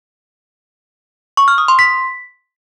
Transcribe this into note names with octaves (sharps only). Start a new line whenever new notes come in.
C#6
F6
D#6
C6
B6